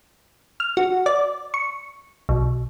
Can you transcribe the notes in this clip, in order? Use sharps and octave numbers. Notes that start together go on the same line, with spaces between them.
F6
F#4
D5
C#6
B1